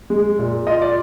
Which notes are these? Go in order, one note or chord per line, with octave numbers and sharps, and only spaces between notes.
G#3
A#2
F4 D#5
D5